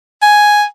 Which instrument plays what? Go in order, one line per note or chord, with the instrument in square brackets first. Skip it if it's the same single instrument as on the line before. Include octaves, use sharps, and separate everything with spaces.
[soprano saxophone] G#5